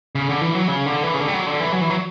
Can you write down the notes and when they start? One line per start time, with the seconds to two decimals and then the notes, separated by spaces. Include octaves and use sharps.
0.15 C#3
0.29 D3
0.41 E3
0.55 F#3
0.68 C#3
0.86 D3
1.03 E3
1.14 C#3
1.20 D3
1.28 G3
1.34 F#3
1.47 D3
1.60 E3
1.73 F#3
1.81 E3
1.90 F#3